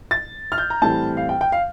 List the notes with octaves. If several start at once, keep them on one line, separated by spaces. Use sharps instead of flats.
A6
F6
G6
A#5
A2 E3 G3 C4 A5
F5
G5
G5
F5